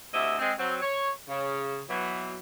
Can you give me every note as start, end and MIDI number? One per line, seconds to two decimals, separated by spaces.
0.14 0.37 38
0.14 0.37 48
0.14 0.37 64
0.14 0.37 75
0.14 0.37 76
0.39 0.52 56
0.39 0.52 60
0.59 0.77 54
0.59 0.77 60
0.82 1.11 73
1.28 1.81 49
1.89 2.37 47
1.89 2.37 52
1.89 2.37 54